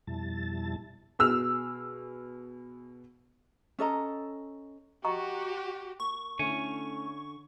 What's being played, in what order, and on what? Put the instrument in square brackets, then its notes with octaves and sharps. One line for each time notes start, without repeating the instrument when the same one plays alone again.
[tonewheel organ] F2 B2 G3 E4 A5 A6
[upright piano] B2 G#4 E6 F6 F7
[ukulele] C#4 A4 D#5 A#5
[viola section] F#4 [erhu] G4 [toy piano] D#5 A#5 C#6
[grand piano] A#3 [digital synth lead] C#6
[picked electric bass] D3 [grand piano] A3 C#4 E4 [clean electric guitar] C#5 G#5